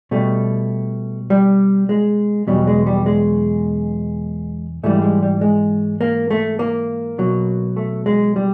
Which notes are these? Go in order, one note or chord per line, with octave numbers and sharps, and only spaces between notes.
B2 G3 A3
G3
G#3
E2 B2 F#3 G3
G#3
G3
G#3
G#2 E3 G3 A3
G#3
G3
G#3
A#3
A3
A#3
B2 F#3
A3
G#3
G3